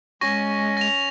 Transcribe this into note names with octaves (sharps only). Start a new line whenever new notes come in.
G#3 C#4 C#6 A#6
A#6 F7